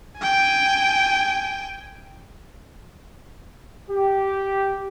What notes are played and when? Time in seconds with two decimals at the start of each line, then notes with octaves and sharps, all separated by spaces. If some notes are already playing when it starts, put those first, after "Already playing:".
0.18 G5 G#5
3.89 G4